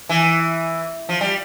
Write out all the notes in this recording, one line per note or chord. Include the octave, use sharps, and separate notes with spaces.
E3
F3
G3